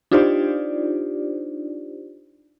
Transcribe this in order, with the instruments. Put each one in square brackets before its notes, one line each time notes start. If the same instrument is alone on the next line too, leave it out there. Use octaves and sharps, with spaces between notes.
[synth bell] D4 D#4 F4 G4 C5 D5